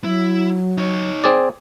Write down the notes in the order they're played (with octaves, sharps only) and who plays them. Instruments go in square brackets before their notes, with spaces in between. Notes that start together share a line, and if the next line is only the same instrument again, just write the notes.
[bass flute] F#3 [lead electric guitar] E4
[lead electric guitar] D#4 C#5
[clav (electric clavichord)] C4 G#4 D5